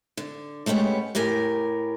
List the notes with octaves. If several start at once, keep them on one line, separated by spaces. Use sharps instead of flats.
D3
G#3 A3 B3 C#4 G4
A2 G4 A#4 G#5